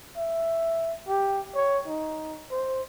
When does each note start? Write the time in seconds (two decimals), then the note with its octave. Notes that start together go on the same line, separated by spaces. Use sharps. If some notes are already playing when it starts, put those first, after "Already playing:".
0.17 E5
1.08 G4
1.55 C#5
1.87 D#4
2.51 C5